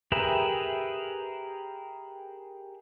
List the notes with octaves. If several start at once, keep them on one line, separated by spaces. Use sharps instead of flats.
G4 G#4 A#4 B4 E5